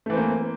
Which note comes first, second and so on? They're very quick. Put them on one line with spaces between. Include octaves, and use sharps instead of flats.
A3 E3 C4 A#3